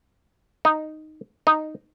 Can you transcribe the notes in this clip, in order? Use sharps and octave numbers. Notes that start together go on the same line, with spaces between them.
D#4
D#4